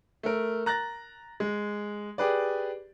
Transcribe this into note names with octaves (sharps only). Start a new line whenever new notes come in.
A3 A#4
A#5 F#6 A6 A#6
G#3
G4 G#4 B4 D5